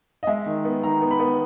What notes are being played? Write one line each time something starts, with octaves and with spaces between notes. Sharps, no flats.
D#5
G#3 E5
D#3
B3
D#3 A#5
B3
B5
B3